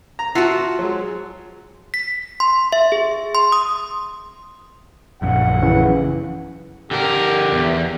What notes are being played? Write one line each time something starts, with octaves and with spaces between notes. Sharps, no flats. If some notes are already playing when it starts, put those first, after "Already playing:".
A#5
F4 F#4 E5 F#5 A5
F#3 G#3
B6
C6
E5
G#4
C6
D#6
A#1 F#2 F#5
C#3 E3
D3 G4 A#4
E2